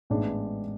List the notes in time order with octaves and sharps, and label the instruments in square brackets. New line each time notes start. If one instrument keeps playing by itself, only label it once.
[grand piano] A1 G#2 G#3 B3 D4